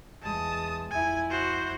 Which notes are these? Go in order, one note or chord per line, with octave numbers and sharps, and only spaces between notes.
E2 G#3 A5 D#6
F2 E4 G#5
F#4 C5